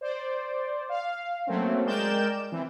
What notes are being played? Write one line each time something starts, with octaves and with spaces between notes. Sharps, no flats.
C5 D5
F5
F#3 A3 A#3 C4 C#4
G#3 A#4 D5 G5 G6 E7
E3 C4